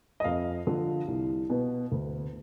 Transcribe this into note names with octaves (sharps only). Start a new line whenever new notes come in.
D#5
F2 F5
D3 F3
C2
B2 B3
D2